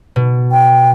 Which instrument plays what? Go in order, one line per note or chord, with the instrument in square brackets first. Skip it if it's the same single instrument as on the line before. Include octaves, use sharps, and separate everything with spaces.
[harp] B2
[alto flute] G5